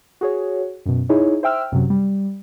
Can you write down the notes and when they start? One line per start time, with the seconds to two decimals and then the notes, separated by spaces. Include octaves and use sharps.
0.21 F#4 G#4 C#5
0.86 F#2 B2
1.09 D#4 E4 G#4 C#5
1.43 C5 E5 G5 E6 F6
1.72 F#2 C3 F#3
1.90 G3